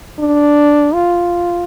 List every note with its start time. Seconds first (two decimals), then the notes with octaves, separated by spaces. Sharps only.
0.20 D4
0.94 F4